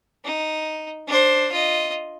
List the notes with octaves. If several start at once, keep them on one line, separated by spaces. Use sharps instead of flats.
D#4
D4 C5
F4 D#5